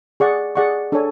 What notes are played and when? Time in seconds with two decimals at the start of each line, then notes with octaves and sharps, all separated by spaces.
0.20 G#4 D5 F#5 C#6
0.55 G#4 D5 F#5 C#6
0.92 D4 A4 C#5 G#5